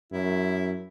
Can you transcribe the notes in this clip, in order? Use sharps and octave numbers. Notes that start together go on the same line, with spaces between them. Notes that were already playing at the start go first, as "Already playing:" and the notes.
F#2 E4